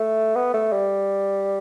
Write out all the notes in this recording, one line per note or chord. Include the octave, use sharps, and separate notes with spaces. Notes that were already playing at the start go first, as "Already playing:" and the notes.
Already playing: A3
B3
A3
G3